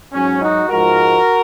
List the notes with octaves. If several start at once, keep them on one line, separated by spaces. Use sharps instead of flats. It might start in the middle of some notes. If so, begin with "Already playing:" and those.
G#2 F#3 C#4
D#4 F#4
G#2 F3 G#3 F#4 A#4